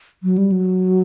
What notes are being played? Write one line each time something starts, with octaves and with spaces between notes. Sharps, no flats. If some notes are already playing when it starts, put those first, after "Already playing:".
F#3
G3
F#3